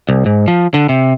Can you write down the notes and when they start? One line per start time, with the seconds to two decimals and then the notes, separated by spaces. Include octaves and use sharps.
0.09 C2
0.26 G#2
0.48 F3
0.74 D3
0.89 C3